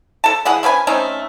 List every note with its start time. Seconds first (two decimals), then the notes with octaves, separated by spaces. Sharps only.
0.24 A4 A5
0.45 E3 G#4 F#5
0.63 A3 C#4 B4 G#5
0.87 A3 C4 C#4 D#4